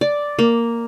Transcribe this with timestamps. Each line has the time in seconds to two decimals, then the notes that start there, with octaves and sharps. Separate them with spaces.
0.01 D5
0.39 A#3